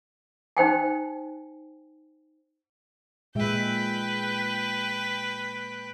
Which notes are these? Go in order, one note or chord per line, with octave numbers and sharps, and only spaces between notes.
D#4 C5 G5 G#5
A#2 G#3 B4 E5 G5